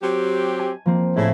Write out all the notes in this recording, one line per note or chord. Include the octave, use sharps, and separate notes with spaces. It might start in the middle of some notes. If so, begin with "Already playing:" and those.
F#3 C4 G4
G#5
F3 A#3 C4
A2 C#3 A3 E4